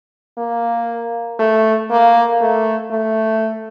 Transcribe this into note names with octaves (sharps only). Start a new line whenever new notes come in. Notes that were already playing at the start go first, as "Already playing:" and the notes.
A#3
A3
A#3
A3
A3